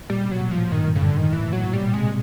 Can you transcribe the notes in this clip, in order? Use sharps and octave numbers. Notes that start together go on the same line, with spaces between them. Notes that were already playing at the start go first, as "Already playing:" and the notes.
A#2 G3
B2
F#3
A#2
F3
A2
G2 D#3
F#2
C#3
G2 D3
G#2 D#3
A2 E3
A#2 F#3
A#2
G3
B2
C3 G#3